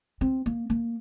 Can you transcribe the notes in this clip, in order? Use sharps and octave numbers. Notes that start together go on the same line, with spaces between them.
C4
A#3
A#3